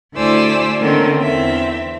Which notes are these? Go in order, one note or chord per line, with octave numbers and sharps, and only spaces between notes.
D2 E4 C5 D5 G#5 E6
D3 D#3 A#3 C4 C#4 A#4
E2 C4 E5